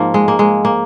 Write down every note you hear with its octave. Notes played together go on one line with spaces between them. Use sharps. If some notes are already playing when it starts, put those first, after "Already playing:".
Already playing: G#2 F3 A#3
G#3
A#3
G#3
A#3